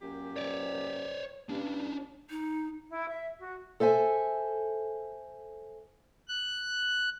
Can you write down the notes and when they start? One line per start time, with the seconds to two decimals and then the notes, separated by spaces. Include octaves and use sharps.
0.01 F#2 A#2 G4
0.36 C#5 D5
1.49 G2 C#4 D4
2.30 D#4
2.90 E4
3.08 E5
3.39 F#4
3.80 A4 C5 E5 G#5
6.28 F#6